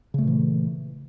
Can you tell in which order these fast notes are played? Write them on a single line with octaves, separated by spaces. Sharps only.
C#3 A3 A#2 E3